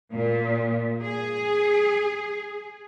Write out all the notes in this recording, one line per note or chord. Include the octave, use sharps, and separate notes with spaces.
A#2
G#4